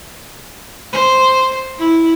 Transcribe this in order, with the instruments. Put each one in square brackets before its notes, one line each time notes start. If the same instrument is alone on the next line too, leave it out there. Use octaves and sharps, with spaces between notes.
[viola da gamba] C5
E4